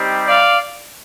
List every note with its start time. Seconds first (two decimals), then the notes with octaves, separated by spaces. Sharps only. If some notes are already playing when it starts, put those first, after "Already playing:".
Already playing: G3 C4 D#4 G4
0.26 D5 F5